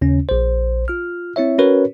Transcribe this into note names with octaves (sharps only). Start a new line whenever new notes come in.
D#2 C#3 C#4
A#1 C5
F4 F6
C4 E4 C#5 E5
C#4 F#4 A#4 B4 C#5